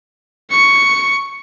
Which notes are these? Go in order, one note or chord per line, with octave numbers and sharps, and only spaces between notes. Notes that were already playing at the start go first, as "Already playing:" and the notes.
C#6 C#7